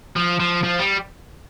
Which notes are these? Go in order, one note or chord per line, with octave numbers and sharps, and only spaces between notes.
F3
F3
F3
G3